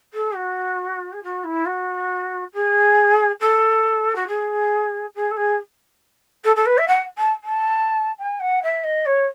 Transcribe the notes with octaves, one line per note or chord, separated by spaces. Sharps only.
A4
F#4
G#4
F#4
E4
F#4
G#4
A4
F#4
G#4
G#4
A4
G#4
A4
A4
B4
E5
F#5
A5
A5
G#5
F#5
E5
D#5
C#5